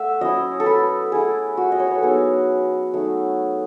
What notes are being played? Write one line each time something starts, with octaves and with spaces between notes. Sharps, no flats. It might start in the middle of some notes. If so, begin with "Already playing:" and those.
Already playing: A3 E5 F#5
F#3 C#4 E4 D#5
A4
B4
A3 E4 G#4
F#4
D#5
C#5
B4
A4
F#3 B3 D#4 G#4
F#3 A3 D#4